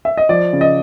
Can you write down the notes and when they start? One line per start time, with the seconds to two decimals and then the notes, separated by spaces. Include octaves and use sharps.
0.05 E5
0.17 D#5
0.29 F3 D5
0.53 C#3
0.61 D#5